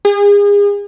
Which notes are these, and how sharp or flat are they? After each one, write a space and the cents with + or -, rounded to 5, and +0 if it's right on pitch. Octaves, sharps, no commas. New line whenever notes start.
G#4 -35